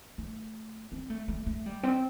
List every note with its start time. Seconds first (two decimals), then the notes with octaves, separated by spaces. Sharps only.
0.18 A3
0.92 C4
1.10 A3
1.28 A3
1.47 A3
1.66 G3
1.83 C4